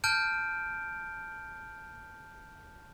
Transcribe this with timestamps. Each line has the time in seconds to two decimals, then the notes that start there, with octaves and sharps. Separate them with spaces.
0.04 A5 F6 G6 D7